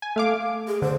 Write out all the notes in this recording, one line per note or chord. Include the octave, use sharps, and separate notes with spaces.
G#5
A3 F5 D6
G#4
D3 C5